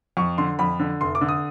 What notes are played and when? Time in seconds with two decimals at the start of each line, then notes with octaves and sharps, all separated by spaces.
0.17 F2 C#6
0.38 D3 C6
0.59 F2 B5
0.80 D3
1.01 F1 C6
1.15 D6
1.21 D3
1.29 D#6